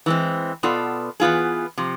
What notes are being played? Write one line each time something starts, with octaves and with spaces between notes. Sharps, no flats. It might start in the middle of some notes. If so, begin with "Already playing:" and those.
E3 G#3 C4
B2 B3 F4 A4 D5
E3 B3 F4 G#4
C3 F3